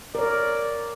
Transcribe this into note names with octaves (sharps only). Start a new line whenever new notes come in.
A#4 C#5 D5